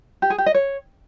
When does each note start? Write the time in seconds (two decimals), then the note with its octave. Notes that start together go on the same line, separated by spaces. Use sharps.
0.22 G4
0.30 G#4
0.38 G4
0.46 D#5
0.54 C#5